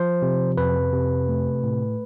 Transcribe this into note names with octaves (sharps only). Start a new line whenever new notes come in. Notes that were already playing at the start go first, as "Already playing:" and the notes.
Already playing: F3 C5
C3
F2 B4
C3
A3
A2